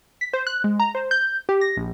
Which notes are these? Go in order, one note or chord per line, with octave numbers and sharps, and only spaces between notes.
B6
C5
F#6
G#3
A#5
C5
G6
G4
A#6
A#1